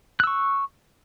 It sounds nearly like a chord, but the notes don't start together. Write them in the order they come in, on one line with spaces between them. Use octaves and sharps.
F#6 E6 C#6